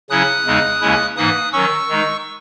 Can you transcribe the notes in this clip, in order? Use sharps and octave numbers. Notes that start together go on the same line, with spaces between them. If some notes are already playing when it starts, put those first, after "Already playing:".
C#3 F#3 C#4 E4 D#6 F#6
E2 C#3 G#3 D#4
D#2 C#3 G#3 C#4 E4
G#2 E3 A#3 D#4 D#6 F#6
D#3 F#3 C#4 C#6 E6
D#3 G#3 D#4